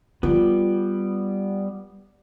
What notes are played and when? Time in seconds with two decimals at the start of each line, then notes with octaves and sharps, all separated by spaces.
0.23 G3 B3 F4